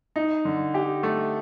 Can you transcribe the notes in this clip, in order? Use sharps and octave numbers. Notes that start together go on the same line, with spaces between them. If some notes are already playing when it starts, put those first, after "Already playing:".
D#4
D3
G4
A3